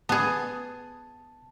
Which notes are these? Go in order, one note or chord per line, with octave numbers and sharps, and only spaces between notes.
B3 G#4 A5